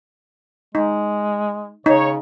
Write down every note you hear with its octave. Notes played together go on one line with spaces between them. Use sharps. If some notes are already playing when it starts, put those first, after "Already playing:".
G#3 D#4
C#3 D#4 C#5